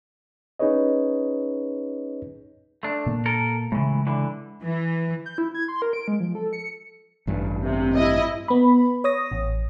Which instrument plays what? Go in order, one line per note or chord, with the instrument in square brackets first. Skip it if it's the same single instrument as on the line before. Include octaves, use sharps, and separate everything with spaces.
[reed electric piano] C#4 D#4 G#4 B4 C#5 D#5
[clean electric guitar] A3 D4
[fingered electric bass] A#2 A#3
[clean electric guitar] A4 A#4
[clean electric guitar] A2 E3 [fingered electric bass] C#3 G#3
[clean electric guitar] D3 E3
[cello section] E3
[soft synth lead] G6
E4
G#6
C6
A#4
D7
G#3
F3
A4
C#7
[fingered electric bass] A1 G2
[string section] C3
E4 D#5
[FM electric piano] B3 B5
C#5 D#6 A#6
A1